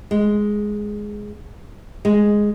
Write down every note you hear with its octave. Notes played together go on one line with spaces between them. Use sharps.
G#3
G#3